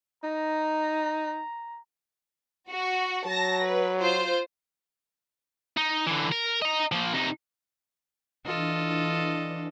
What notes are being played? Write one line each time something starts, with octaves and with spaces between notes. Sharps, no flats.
D#4 A#5
F#4
F#3 A5 A#6
B4
F4 C5
D#4
D3 E3
A#4
D#5 A#5
F3 A#3
C3 D#4
E3 D4 F4 A4 D#5